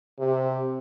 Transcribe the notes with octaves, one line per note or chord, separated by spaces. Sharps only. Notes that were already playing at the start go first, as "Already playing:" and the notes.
C3